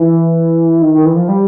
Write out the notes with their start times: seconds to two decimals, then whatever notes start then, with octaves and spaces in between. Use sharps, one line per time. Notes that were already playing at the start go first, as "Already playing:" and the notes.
Already playing: E3
0.82 D#3
0.94 D#3
1.05 E3
1.17 F3
1.28 G3